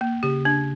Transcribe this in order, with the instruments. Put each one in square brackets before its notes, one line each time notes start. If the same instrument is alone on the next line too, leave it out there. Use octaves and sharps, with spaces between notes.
[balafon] A#3
[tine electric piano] C#3 [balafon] G4
[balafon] D4